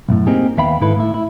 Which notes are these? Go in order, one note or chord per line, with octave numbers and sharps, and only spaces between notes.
B1 F#2 A2
A#3 C4 D#4 G4 G#4
D#2 B3 E5 F5 G5 B5
G#2 D#3 E4 A4 B4
A2 E4
E4